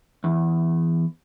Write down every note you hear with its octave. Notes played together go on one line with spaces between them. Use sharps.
E2